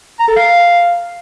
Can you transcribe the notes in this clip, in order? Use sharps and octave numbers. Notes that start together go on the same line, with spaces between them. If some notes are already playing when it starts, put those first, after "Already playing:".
A#5
A4
F5